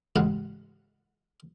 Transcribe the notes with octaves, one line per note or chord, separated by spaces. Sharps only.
A1 G#2 C#3 F5 F#5